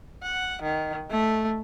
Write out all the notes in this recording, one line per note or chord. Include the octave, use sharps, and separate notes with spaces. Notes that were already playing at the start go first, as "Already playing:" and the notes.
F#5
D#3
A3